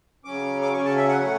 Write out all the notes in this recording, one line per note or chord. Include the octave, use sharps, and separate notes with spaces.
C#3 F#3 C#4 D6
D6
C#3 F#3 C#4 C#6
A5
E5
F#5
A2 F#3 A3 C#4